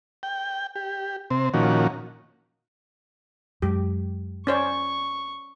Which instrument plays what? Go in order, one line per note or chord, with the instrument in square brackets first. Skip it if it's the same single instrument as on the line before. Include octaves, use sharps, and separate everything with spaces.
[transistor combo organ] G5
G4
C3 C4
A#2 D#3 F3 C#4 F#4
[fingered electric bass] F#2 G#3 [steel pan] G4
[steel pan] C#4 C5 D5 [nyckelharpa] C#6